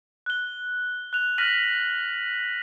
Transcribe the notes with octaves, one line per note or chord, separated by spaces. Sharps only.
F#6 G7
F#6 F7
F6 F#6 A#6 B6 D#7 F#7